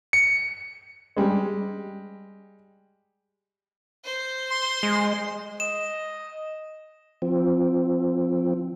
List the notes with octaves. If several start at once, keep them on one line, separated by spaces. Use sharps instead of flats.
C#7
G3 G#3
C5
C6
G#3
D#5 E7
F3 C4